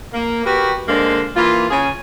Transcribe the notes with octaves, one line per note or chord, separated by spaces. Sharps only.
A#3
F#4 G4 A#4 B4
D3 G#3 A#3 D4 C5
E3 A#3 F4
C#3 C#4 G#4 G#5